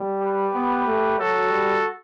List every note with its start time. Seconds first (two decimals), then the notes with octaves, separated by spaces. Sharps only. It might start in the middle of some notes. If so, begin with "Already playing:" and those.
Already playing: G3
0.22 G4 B4
0.54 B3
0.86 A3
1.18 F#3 F#4 A4
1.50 G3